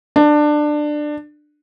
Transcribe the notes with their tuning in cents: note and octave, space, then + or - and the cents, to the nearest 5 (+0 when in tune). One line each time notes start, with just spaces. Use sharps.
D4 +20